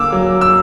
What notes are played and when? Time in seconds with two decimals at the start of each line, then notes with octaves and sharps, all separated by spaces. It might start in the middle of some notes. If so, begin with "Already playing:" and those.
Already playing: D3 A#3 D6 E6
0.12 F#3
0.41 E6